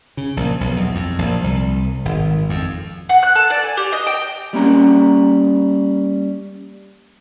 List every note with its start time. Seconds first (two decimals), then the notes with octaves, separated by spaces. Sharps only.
0.17 C#3
0.37 A#1
0.61 B1
0.76 E2
0.95 F2
1.19 A#1
1.44 C2
2.05 G#1
2.49 F2
3.09 F#5
3.23 F#6
3.35 A4
3.50 D5
3.64 G#5
3.77 G4
3.92 D#5
4.07 G5
4.53 G3 A#3 C#4 A#5